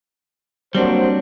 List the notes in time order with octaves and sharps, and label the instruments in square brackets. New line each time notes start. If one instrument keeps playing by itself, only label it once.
[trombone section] F#3 A#3 C5 [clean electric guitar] G3 C4 D4